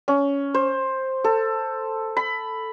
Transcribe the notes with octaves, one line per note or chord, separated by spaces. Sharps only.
C#4
C5
A4
B5